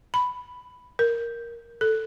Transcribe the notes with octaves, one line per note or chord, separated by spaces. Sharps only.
B5
A#4
A4